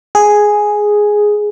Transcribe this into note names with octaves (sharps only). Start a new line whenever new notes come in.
G#4